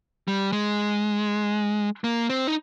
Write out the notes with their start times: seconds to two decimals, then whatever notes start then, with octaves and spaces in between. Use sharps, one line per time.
0.28 G3
0.52 G#3
2.04 A#3
2.30 C4
2.47 D#4